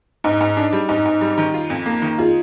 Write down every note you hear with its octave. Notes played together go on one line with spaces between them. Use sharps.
G#2 D#4
G#2
D4
G3
G#2 D#4
G#2
G3
D#3
F4
F2
A#3
D#3
F4 G#4